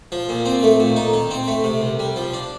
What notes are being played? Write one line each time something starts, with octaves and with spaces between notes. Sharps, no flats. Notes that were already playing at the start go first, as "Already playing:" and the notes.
F3
A#2
C4
A3
A#2
D#4
D#3
C4
A3
C3
C2
G3
F3
D4